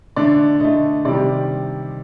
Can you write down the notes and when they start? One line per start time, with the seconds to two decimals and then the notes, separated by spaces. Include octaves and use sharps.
0.16 D3 A3 D5
0.60 D3 A3 D#5
1.05 C3 D#3 G3 D5